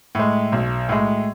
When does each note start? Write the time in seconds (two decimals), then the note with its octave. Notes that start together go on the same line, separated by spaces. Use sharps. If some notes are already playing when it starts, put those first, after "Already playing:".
0.15 A2 G#3
0.52 B1
0.89 A2 G#3